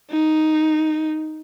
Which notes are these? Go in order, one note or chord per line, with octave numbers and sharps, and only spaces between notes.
D#4